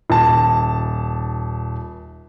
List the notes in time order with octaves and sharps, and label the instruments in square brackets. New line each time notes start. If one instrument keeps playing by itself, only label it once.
[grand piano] D#1 A5